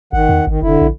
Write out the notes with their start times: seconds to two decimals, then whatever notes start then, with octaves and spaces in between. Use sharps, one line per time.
0.13 G#1 D#3 F#5
0.29 E2
0.47 G#1 D#3
0.62 F1 D3 E4
0.81 A#1